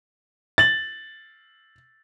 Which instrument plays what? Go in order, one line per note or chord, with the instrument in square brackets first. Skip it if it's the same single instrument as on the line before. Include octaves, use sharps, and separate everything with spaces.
[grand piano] A6 F#7